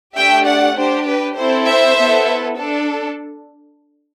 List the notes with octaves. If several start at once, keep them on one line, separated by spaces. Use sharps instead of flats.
A3 D4 G4 E5 G5
D5 F#5
D4 G4 C5
B4
C4 E4 A4 C5
C5 E5
B3 E4 A4
D4 A4